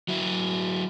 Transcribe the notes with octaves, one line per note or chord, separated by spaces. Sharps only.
F#3 E4